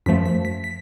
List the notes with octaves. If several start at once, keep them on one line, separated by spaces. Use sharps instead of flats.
F#2 F3 A3 B6
B6
B6
B6